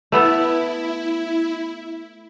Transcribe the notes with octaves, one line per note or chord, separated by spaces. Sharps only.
A3 B3 E4 A4